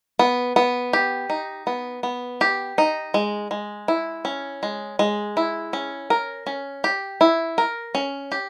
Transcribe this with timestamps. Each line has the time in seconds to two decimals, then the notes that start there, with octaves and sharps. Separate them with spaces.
0.19 B3
0.56 B3
0.93 G4
1.30 D#4
1.67 B3
2.03 B3
2.41 G4
2.78 D#4
3.14 G#3
3.51 G#3
3.88 E4
4.25 C#4
4.63 G#3
4.99 G#3
5.37 E4
5.73 C#4
6.10 A#4
6.47 C#4
6.84 G4
7.21 E4
7.58 A#4
7.95 C#4
8.32 G4